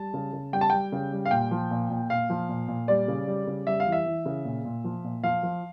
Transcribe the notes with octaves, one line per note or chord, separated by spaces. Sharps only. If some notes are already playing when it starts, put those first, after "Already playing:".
Already playing: G3 A5
C#3
C#3
G3 G5
A5
G3 G5
C#3
G3
F5
A#2 G5
F3
A#2
A#2
A#2 F5
F3
A#2
A#2
G3 D5
C#3
G3
C#3
G3 E5
F5
E3
E5
E3
C#3
A#2
A#2
F3
A#2
F3 F5
F3